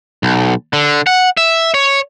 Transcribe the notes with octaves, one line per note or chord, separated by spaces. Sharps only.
B1
D3
F#5
E5
C#5